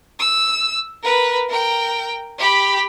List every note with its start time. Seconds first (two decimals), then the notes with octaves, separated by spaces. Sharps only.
0.19 E6
1.03 A#4 B4
1.49 A#4 G5
2.39 G4 B5